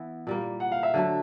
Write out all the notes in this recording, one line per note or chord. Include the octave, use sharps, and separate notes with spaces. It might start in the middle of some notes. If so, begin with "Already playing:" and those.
Already playing: E3 B3 E4
A#2 G3 A#3
F#5
F5
E5
D3 F#3 A3